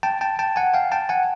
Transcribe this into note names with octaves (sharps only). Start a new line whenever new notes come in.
G5 A5
G5 A5
G5 A5
F#5 G#5
F5 G5
G5 A5
F#5 G#5